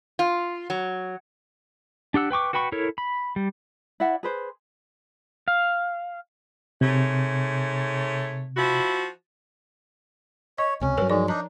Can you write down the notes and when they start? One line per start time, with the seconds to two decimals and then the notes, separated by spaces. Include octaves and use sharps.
0.19 F4
0.70 F#3
2.14 D4 G4 F#5 E6
2.31 B4 G5 C#6 D6
2.53 F#4 B4 G5 B5 C#6
2.72 E4 A4 A#4 C#5
2.98 B5
3.36 G3
4.00 E4 D5 E5 F#5
4.23 G#4 B4 C5
5.48 F5
6.81 G#2 C3 A3 C#5
8.56 F3 E4 F#4
10.58 C#5 D#5
10.81 C#2 C3 C#4
10.97 G2 F#3 A#4 B4 C#5
11.10 F3 G#3 D#4 D5
11.28 D4 D#4 A#5